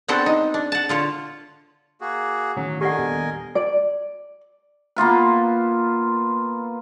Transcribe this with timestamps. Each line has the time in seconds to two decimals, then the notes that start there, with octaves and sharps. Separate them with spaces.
0.08 B3 C4 D4 F#4 A4 C5
0.26 D#4
0.54 D4
0.72 F#5 A5
0.89 D3 F4 C#5
2.01 A#3 F#4 G#4
2.56 A1 D#3 F#3 C#4
2.81 D3 G4 A#4 D#5 F#5 G#5
2.98 D#1 E2 B3
3.55 D5
4.96 A#3 B3 F4 B4